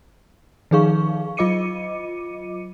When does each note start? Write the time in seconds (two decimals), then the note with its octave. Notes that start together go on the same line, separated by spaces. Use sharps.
0.71 D#3 F3 D#4 G#4 F5 C#6
1.37 F#3 F4 D#5 D6 C#7 D#7